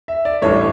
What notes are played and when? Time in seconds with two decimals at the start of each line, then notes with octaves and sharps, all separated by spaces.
0.08 E5
0.25 D5
0.42 A1 G2 E3 A3 C#5